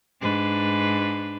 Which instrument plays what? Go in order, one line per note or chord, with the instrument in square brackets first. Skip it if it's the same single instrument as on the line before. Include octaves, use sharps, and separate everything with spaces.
[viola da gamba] G#2 D4 B4